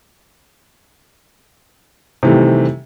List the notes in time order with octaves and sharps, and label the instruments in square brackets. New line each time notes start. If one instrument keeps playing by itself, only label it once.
[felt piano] C3 D#3 E3 G3 A3